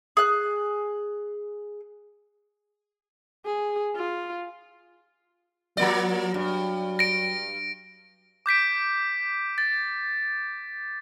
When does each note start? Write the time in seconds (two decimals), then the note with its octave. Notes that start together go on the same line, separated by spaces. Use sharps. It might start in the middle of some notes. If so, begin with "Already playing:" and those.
0.17 G#4 F#6
3.46 G#4
3.96 F4
5.77 F3 F#3 A#3 D5
6.34 G2
6.99 A#6 D7
8.46 D6 G6 B6 D7
9.58 A6